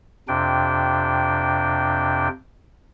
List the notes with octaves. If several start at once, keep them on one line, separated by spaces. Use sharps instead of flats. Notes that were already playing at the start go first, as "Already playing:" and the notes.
F2 C3 D4 G5